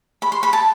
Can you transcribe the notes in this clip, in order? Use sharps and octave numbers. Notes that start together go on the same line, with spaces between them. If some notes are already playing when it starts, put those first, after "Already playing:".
B5
C6
B5
A5